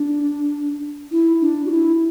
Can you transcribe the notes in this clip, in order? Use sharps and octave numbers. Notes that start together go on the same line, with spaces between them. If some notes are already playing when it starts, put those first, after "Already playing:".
Already playing: D4
E4
D4
F#4
E4